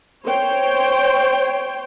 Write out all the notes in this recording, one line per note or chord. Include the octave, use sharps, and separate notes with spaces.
C5 C#5 G5